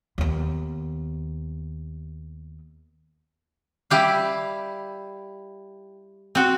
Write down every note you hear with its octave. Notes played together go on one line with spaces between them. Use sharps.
D#2 B3
G3 E4 G4 F5
C4 F#4